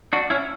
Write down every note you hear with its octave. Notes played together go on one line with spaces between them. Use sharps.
D4 F#4
C#4 E4